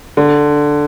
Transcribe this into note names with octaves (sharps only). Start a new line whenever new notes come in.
D3